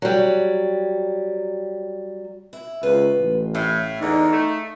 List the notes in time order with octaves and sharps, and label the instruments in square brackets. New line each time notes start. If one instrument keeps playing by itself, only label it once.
[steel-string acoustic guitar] F#3 G3
E4
[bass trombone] C#2 [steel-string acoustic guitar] F4 B4
[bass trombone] A1
[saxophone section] A2 [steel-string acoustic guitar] E5 F5
[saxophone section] E2 D3 [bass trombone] D#4
[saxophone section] A3